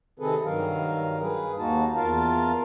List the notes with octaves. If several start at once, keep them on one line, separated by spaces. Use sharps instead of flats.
C3 D#3 C4 G#4 A4 B4
G2 D#3 F#3 A#4 F5
G#4 B4
D#2 A#3 D#4 F#4 A5
E2 F4 A#4 F5 A5